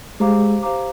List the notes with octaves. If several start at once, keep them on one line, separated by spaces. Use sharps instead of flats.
G#3 G4 C5 F5 A#5 D6
G4 C5 F5 A#5 D6